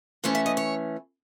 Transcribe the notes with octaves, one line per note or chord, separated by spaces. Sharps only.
E3 A3 C#4 C5
E5
D#5
C#5